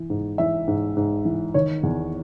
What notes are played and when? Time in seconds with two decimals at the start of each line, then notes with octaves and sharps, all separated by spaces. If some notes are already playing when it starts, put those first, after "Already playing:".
Already playing: E3
0.10 G#2
0.38 E3 E5
0.68 G#2
0.97 G#2
1.25 E3
1.54 D#3 C#5
1.83 E2